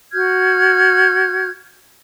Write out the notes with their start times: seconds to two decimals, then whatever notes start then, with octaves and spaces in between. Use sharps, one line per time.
0.12 F#4 F6 G6 G#6